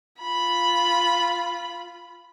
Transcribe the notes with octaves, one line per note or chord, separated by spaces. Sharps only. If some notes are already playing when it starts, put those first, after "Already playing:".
F4 B5